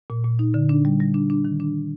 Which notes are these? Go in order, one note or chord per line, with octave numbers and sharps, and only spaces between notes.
A#2
A#2
D#4
D3
D4
G3
G3
D4
D4
D#3
D4